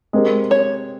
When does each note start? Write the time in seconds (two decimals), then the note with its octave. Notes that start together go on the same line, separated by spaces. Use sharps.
0.13 G#3 C4 G4 A#4
0.51 C#5